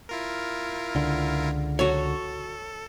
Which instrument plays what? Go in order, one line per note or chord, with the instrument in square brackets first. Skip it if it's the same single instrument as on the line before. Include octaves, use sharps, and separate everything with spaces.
[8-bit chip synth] E4 F4 A#4
[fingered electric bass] C#2 D3
[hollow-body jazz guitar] F#4 C#5 [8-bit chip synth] A4